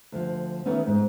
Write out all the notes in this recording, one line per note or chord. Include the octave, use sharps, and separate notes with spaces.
D2 F3
D#3 E3 A3 B3 C#4
G#2